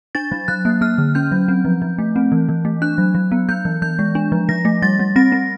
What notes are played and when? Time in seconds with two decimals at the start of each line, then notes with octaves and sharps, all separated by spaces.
0.15 D4 A6
0.32 F#3
0.48 F#3 F#6
0.65 A#3
0.81 A#3 F6
0.98 D3
1.15 C#4 G6
1.32 F#3
1.48 C4
1.65 F3
1.82 F3
1.99 A3
2.16 C4
2.32 E3
2.49 E3
2.65 A3
2.82 D4 F#6
2.98 F#3
3.15 F#3
3.32 B3
3.49 B3 G6
3.65 E3
3.82 E3 G6
3.99 G#3
4.15 D4
4.32 F3
4.49 F3 A#6
4.65 A3
4.82 G3 A6
4.99 G3
5.16 C4 A#6
5.32 C4